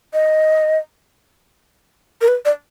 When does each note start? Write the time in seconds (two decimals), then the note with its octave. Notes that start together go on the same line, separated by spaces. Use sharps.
0.14 D#5
2.21 A#4
2.28 B4
2.45 D5